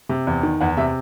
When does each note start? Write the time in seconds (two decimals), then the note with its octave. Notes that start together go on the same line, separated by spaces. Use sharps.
0.09 C3
0.27 E2
0.43 D#3
0.61 E2 F#5
0.77 C3 E5